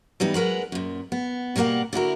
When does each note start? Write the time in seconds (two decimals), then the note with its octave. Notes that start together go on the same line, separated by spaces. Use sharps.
0.20 E3 G3 B3 D#4
0.34 F#3 G#3 A#4 B4 F#5
0.72 F#2 A#2
1.12 B3
1.56 B2 G3 A#3 A#4 F#5
1.93 D3 E4 F#4 A#4